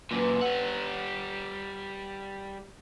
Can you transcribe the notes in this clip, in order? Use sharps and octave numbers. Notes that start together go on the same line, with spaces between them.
F#2 A#2 B4 C5 G5
G3 F#5 E6 D#7